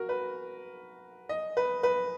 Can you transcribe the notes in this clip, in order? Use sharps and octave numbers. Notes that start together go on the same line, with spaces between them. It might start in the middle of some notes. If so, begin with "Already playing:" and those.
Already playing: F#4 A#4
B4
D#5
B4
B4